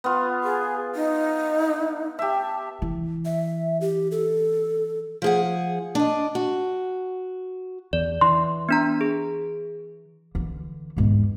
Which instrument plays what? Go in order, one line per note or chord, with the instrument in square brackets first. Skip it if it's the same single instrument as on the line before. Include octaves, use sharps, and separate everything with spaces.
[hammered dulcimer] B3 F4
[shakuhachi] G#4
D#4
[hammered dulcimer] G4 E5 [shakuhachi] A5
[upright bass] E3
[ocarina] E5
G4
A4
[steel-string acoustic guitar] F3 G#4 F#5
D4 D#5
F#4
[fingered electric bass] E2 [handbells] D5
[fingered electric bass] E3 [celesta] C6
[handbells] B3 D4 A#5
G#4
[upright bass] D3 E3
E2 G#2